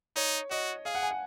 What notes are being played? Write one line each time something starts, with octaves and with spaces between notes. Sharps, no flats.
D#4 C#5
F#4 D#5
G#4 F5
F#5
G#5
F#5